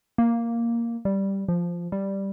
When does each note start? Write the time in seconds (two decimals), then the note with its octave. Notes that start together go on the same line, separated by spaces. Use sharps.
0.18 A#3
1.05 G3
1.48 F3
1.92 G3